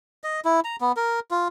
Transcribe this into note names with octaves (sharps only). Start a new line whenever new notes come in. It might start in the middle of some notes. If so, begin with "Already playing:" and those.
D#5
E4
A#5
B3
A#4
F4